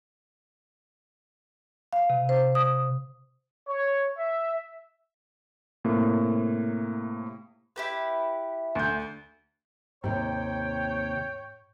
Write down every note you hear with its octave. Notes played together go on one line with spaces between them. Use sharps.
F5
C3
C5
D#6
C#5
E5
A2 C3 A#3
E4 G4 B4
D2 G6
D#2 G#2 C3 C#5 G5